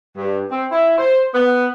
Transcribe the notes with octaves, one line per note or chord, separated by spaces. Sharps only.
G2
C4
E4
C5
B3